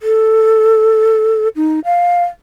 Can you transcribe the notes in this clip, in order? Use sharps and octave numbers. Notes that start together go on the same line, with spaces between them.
A4
D#4
F5